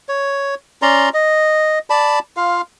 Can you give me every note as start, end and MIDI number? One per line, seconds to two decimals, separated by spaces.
0.09 0.55 73
0.82 1.09 61
0.82 1.09 74
0.82 1.09 82
0.82 1.09 84
1.14 1.79 75
1.90 2.19 74
1.90 2.19 81
1.90 2.19 83
2.37 2.61 65
2.37 2.61 77